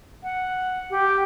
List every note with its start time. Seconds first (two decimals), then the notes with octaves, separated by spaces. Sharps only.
0.23 F#5
0.90 G4